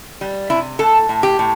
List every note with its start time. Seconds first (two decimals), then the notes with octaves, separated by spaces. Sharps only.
0.21 G3
0.50 C3 E4
0.79 A2 A4
1.09 A2
1.23 G4
1.39 A2